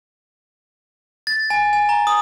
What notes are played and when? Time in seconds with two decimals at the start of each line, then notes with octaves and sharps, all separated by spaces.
1.27 A6
1.50 G#5
1.73 G#5
1.89 A#5
2.07 D#6